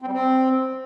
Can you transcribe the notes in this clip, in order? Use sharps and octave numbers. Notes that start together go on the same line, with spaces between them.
C4
G3
C4